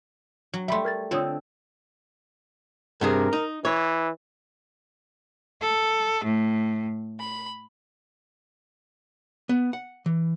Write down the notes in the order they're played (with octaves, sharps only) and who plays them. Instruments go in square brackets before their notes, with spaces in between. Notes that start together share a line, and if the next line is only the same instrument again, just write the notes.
[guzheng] F#3
[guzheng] G3 A3 [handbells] E5 B5 C6
[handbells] A#4 G#6 A6
[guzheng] D3 C4 A4 [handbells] F4 C#5 D#6
[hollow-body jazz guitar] G2 C3 G#4 [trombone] A#4
[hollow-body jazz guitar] D#4
[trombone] E3 [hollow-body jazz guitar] C#5
[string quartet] A4
A2
B5
[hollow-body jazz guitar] B3
F#5
E3